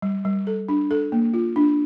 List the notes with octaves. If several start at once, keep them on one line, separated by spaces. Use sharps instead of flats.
G3
G3
A4
D4
A4
A#3
F4
D4